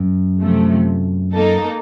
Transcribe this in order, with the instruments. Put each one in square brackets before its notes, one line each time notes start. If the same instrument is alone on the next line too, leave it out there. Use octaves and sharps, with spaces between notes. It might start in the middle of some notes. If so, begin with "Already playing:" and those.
Already playing: [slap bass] F#2
[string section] C3 F3 A3
A#3 D#4 A4